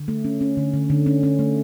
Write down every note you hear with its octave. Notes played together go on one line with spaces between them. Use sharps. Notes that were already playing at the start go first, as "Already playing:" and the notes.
Already playing: D3
A3
C#4
C#4
D3
D3
D3
C#4
C#4
A3